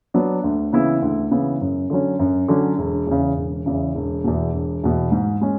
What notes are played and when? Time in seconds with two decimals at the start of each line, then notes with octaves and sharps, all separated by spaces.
0.14 F#3 B3 D4
0.44 D2
0.73 C#3 E3 B3 E4
1.02 D2
1.31 C#3 E3 B3 E4
1.61 F#2
1.90 D3 F#3 C#4
2.19 F#2
2.48 D3 F#3 C#4
2.78 E1
3.07 E2 C#3
3.37 E1
3.66 E2 C#3
3.95 E1
4.24 E2 B2
4.54 E1
4.83 E2 B2
5.12 G#2
5.41 G#3 C#4